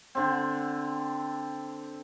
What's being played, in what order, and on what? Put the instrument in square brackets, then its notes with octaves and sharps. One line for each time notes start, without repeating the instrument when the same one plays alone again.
[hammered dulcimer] D3 C4